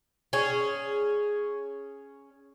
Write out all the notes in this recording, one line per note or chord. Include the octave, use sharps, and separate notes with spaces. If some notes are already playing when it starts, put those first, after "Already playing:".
C#4 G#4